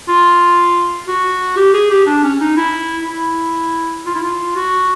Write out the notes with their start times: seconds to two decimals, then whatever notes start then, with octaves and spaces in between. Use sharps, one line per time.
0.08 F4
1.07 F#4
1.57 G4
1.74 G#4
1.90 G4
2.07 D4
2.24 C#4
2.41 D#4
2.57 E4
3.07 E4
4.06 F4
4.15 E4
4.23 F4
4.56 F#4